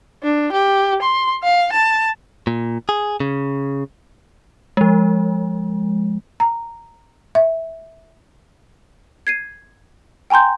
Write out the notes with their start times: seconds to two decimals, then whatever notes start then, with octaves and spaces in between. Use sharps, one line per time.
0.23 D4
0.52 G4
1.02 C6
1.43 F5
1.73 A5
2.47 A#2
2.89 G#4
3.20 C#3
4.77 F3 G#3
6.40 A#5
7.35 E5
9.27 G#6 C7 D#7
10.30 G5 G#5 A#5 C6 G6